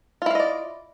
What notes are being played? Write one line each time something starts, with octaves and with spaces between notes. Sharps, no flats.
E4 F4 D5 D#5 F5